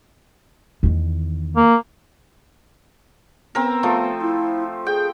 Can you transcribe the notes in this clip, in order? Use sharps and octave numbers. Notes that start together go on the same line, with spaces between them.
E2 D#3
A#3
B3 C4 A#4
F3 A3
E4
G#4 G5